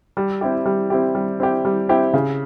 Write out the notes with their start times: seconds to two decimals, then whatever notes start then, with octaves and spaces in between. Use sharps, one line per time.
0.17 G3
0.41 C4 E4 G4
0.65 G3
0.90 C4 E4 G4
1.15 G3
1.40 C4 E4 G4
1.65 G3
1.89 C4 E4 G4
2.14 C#3